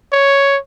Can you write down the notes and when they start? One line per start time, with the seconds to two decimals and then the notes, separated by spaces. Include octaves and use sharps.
0.12 C#5